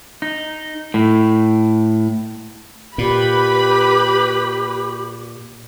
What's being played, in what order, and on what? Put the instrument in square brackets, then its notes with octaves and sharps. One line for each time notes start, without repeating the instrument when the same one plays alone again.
[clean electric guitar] D#4
A2
[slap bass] A#2 [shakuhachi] G4 [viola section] B4 B5